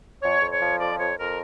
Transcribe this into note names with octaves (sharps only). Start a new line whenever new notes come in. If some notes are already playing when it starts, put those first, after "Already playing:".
F2 C#5
F2
C#5
F3
F2 D5
F2 C#5
F2 A#4